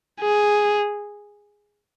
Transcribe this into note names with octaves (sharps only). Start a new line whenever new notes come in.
G#4